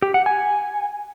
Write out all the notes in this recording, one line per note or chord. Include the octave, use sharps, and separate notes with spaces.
G4
F#5
G#5